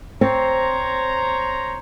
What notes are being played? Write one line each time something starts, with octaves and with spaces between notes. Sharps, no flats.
C4 C5 C#5 A#5